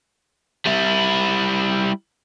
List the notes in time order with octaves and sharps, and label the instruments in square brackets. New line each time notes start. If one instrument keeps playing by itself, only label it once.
[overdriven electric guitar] G3 E4